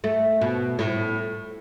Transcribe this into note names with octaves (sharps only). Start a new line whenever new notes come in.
A3
B2
A2